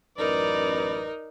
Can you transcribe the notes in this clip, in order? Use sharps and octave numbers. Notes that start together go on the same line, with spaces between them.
A1 F#2 D#4 A#4 B4 D5